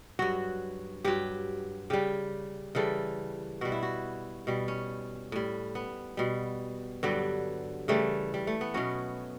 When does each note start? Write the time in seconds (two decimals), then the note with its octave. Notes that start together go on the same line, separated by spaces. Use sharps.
0.19 G2 F#3 F#4
1.04 G2 F#3 G4
1.90 C#3 G3 G4
2.75 C#3 E3 G3 A4
3.61 B2 G3 F#4
3.72 E4
3.83 F#4
4.47 B2 G3
4.68 C#4
5.32 A2 G3
5.75 B3
6.17 B2 G3
7.03 G2 D3 F#3 G3
7.88 C#3 E3 G3 A3
8.34 G3
8.47 A3
8.61 B3
8.74 B2 F#3 C#4